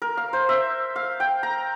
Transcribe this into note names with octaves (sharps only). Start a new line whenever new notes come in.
A#4
F5
C5
E5
F5
G5
A#5